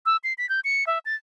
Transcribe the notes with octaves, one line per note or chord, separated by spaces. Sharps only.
E6
C7
B6
G6
C#7
E5
A6